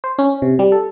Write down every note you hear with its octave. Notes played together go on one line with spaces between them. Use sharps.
C5
C#4
C3
G3
A4